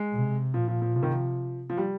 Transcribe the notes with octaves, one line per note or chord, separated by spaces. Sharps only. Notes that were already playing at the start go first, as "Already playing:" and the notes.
Already playing: G#3
C3
A#2 F3
F3
F3
C3 F3
D#3
F3
F3
G3